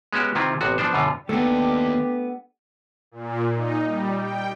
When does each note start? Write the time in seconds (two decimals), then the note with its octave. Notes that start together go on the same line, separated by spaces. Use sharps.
0.13 G#3 B3 C#4 F#4 G4
0.35 C3 D#3 C4 E4 F4
0.61 A1 C3 B3 F#4
0.78 F3 B3 D4 C5
0.93 F#2 B2 D3 F4
1.29 D#2 A3 B3 D4 G4
3.11 A#2
3.54 D#4
3.85 G3
4.17 G5